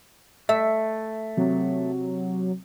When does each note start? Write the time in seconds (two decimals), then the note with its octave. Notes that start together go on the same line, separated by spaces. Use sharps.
0.49 A3 E5
1.37 C3 F#3